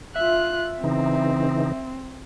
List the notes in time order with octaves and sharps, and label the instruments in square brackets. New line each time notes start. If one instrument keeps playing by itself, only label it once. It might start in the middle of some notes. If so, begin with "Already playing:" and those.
[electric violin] F4 F#6 [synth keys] E5
[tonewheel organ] C#3 E3 D#4 [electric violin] C4